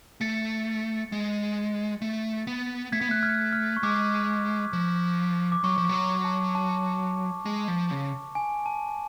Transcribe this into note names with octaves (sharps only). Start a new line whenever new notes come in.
A3 A6 C#7
G#3
A3
B3
A3 G#6 B6
B3
A3 F#6
F6 G#6
F6
C#6
G#3 D6
F3
D6
F#3 C#6
F3
F#3 C#6
A5
A5
G#3
F3
C#3
G#5
A5